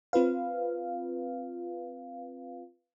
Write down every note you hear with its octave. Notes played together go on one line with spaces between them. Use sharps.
C4 F4 B4 F5